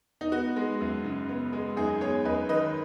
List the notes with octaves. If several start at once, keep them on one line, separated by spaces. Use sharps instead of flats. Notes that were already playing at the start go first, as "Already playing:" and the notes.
D#4
B3 F#4
G#3
F#2
C#3
B3
G#3
F#2 D#4 G#4
B3 G#4 C#5
F#2 B4 D#5
D#3 B4 D#5